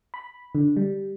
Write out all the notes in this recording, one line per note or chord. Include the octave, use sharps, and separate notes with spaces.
B5
D3
G3